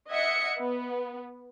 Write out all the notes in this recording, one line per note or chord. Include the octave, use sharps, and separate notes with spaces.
D#5 E5 F#5 G#6 C#7
B3